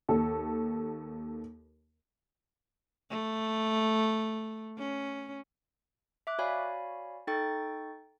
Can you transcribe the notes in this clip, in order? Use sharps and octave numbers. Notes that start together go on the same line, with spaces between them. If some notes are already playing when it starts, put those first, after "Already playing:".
D#2 A4
A3
C#4
E5 D6 F#6
F#4 C#5 D5 F5 G#5 B5
D#4 A4 G5 C#6 A6